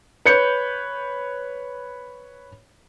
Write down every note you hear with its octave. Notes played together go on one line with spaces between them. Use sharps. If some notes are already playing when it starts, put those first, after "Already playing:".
B4 C#5 G6 C#7